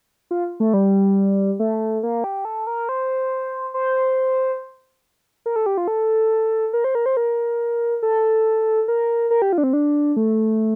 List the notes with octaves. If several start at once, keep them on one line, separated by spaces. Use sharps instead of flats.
F4
A3
G3
A3
A#3
G4
A4
A#4
C5
C5
A#4
A4
G4
F4
A4
A#4
C5
A#4
C5
A#4
A4
A#4
A#4
G4
F4
D4
C4
D4
A3